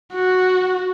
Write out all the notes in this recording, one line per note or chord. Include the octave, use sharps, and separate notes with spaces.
F#4